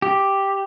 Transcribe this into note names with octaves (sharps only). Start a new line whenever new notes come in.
G4